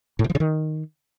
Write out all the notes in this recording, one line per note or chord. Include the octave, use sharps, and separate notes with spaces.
A2
B2
F3
C#3
D#3